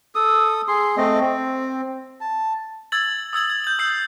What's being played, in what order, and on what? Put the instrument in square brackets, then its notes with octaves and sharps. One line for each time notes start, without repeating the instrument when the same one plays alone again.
[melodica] A4 D#6
G#4 C6
A3 C4 D#5
C4
A5
[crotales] E6 G#6 A6 F#7
D#6 E6 G#6 F#7
G#6
G6 F#7
D#6 E6 G6 C7